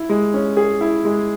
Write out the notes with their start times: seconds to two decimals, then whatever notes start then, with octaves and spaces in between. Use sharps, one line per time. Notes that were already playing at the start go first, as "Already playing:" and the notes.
Already playing: E4
0.09 G#3
0.34 C#4
0.57 G#4
0.81 E4
1.05 G#3